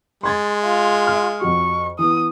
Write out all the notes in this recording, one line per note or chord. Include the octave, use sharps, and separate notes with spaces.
G#3 C6 G#6 A6
F4
F6
F2 F#4 C#6
E3 B3 D#6